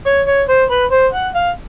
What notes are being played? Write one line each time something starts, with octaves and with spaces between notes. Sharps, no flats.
C#5
C#5
C5
B4
C5
F#5
F5